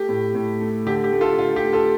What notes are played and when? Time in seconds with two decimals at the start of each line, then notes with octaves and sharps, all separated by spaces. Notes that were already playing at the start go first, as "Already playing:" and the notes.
Already playing: A3 G4
0.09 A2
0.35 A2
0.61 A3
0.86 D3 G4
1.04 G4
1.12 A3
1.21 F4 A4
1.38 D3 F4
1.56 G4
1.64 A3
1.73 F4 A4